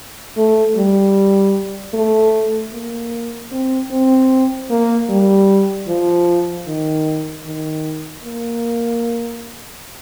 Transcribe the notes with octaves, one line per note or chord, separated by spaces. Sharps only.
A3
G3
A3
A#3
C4
C4
A#3
G3
F3
D#3
D#3
A#3